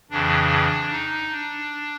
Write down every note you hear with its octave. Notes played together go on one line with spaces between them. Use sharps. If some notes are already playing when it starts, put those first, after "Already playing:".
F2 C#3 E3 D4
D#4
D4